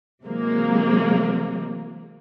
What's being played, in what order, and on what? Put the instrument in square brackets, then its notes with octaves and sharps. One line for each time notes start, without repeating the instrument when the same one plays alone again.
[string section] C3 E3 F#3 G#3 A#3